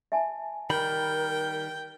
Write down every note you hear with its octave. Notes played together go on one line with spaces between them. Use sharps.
E5 G#5 A5
D#3 G3 A#4 G5 B5